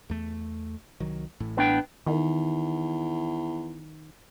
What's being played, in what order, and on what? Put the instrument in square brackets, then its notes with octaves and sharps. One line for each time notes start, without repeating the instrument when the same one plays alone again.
[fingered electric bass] E2 A3
C2 D#3 F#3
A1 A2 E3
[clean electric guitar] B3 D4 G5
[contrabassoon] E2 [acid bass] D#3